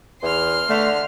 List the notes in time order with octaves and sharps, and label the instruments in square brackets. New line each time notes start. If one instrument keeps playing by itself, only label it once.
[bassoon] E2 [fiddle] C6 F6
[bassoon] D3 [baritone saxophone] A3